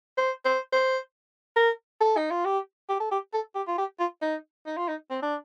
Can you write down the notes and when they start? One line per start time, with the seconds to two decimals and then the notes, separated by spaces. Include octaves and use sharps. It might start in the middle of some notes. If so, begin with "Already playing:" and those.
0.18 C5
0.45 C5
0.72 C5
1.56 A#4
2.01 A4
2.17 D#4
2.31 F4
2.45 G4
2.89 G4
3.00 A4
3.11 G4
3.34 A4
3.55 G4
3.68 F4
3.78 G4
4.00 F4
4.22 D#4
4.66 D#4
4.77 F4
4.88 D#4
5.10 C4
5.23 D4